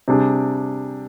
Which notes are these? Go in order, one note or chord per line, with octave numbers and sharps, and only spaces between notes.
C3 G3 D4 G#4